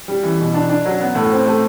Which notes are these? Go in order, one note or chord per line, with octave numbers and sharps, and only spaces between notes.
G3
E3
B2
D4
D4
F#3
B3
A2
C4
A3